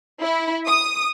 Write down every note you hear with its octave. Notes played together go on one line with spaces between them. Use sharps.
E4
D#6